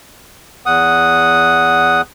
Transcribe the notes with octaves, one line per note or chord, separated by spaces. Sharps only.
E2 F#5 D#6